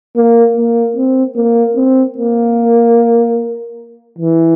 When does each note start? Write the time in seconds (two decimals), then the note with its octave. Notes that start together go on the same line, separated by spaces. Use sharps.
0.17 A#3
0.57 A#3
0.96 C4
1.37 A#3
1.77 C4
2.18 A#3
4.18 E3